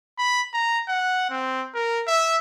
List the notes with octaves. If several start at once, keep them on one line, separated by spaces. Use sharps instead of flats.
B5
A#5
F#5
C4
A#4
E5